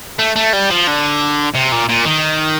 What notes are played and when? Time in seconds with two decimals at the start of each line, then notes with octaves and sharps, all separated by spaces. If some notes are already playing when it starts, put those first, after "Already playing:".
0.19 A3
0.36 A3
0.53 G3
0.70 F3
0.87 D3
1.55 C3
1.72 A#2
1.89 A#2
2.06 D#3